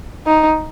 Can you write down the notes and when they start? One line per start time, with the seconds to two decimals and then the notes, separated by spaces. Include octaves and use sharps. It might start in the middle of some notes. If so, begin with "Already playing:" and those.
0.26 D#4